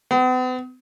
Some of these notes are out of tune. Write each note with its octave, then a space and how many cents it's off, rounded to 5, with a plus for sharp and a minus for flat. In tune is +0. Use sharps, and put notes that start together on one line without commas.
B3 +45